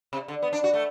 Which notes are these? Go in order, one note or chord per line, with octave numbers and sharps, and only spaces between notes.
C3
D3
B3
D4
F#4
A3